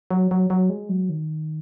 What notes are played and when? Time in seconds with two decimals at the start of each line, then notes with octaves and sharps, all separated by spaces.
0.11 F#3
0.31 F#3
0.50 F#3
0.70 G#3
0.89 F#3
1.09 D#3